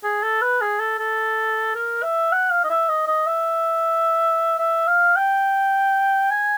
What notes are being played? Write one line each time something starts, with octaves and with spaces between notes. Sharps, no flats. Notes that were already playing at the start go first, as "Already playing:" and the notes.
G#4
A4
B4
G#4
A4
A4
A#4
E5
F#5
F5
D#5
E5
D#5
D#5
E5
E5
F5
G5
G#5